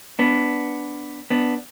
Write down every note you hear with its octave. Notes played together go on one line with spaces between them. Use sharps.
B3 D4
B3 D4